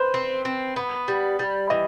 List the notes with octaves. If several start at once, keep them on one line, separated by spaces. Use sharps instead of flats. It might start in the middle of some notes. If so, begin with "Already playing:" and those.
Already playing: B4 C5
C4
C4
B3
G3
G3
E3 D#5